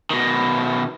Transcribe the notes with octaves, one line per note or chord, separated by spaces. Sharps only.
B2 D#3